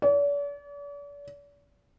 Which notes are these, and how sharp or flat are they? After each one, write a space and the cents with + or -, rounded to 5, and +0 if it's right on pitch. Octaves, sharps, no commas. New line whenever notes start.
D5 -45